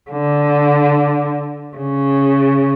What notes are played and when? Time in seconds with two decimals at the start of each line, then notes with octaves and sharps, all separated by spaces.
0.11 D3
1.77 C#3